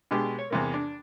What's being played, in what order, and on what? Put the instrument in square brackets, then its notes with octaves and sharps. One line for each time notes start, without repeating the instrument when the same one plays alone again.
[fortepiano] B2 G#3 D4 G4
C#5
E2 C3 A#3
D4